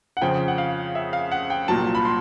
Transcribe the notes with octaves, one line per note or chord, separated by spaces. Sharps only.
F#5
F2 C#3 F3 G5
F#5
F5
E5
F5
F#5
G5
C2 A#2 F#3 A5
B5
C6